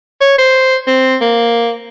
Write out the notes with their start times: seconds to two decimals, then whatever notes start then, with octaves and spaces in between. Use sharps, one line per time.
0.21 C#5
0.38 C5
0.87 C4
1.21 A#3